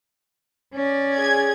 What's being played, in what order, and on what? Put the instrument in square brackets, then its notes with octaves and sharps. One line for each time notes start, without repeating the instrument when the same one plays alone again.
[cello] C#4 D5
[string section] G#4 G#6